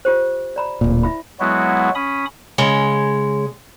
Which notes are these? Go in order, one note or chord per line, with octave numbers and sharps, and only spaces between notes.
F4 G4 C5
D5 A#5 B5
D1 A#2
E4 E5 B5
F#3 G#3 B3 E4 F#4
C#4 B5 D#6
C#3 G#3 C#5